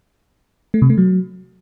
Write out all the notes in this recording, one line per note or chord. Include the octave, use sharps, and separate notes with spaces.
A3
C3
A3
F#3